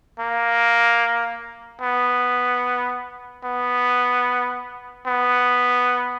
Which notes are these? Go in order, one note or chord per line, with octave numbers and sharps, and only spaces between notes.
A#3
B3
B3
B3